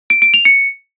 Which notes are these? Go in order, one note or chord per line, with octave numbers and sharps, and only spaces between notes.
D7
D7
F7
C#7